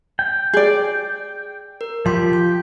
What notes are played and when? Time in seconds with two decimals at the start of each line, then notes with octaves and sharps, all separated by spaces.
0.19 G5
0.53 G#4 D5
1.81 A#4
2.06 F3 F4 G4 C6
2.33 G6